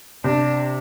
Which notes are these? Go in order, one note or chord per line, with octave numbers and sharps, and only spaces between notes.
C3 D4